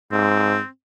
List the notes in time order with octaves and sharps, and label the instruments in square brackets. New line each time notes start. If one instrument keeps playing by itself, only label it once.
[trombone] G#2 [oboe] C4